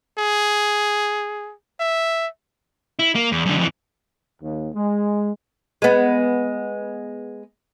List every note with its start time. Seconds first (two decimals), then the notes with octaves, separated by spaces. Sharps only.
0.18 G#4
1.80 E5
2.99 E4
3.15 A#3
3.32 E2
3.46 F#2 D3
3.57 F2 E3
4.42 D#2
4.75 G#3
5.82 G#3 B3